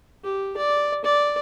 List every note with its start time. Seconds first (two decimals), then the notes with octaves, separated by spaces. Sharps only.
0.24 G4
0.57 D5
1.04 D5